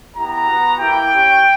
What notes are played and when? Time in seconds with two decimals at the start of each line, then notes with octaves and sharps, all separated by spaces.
0.17 B3 E4 G4 A#5
0.48 B3 F#4
0.79 A#3 E4 G4 G5
1.11 C#4 G4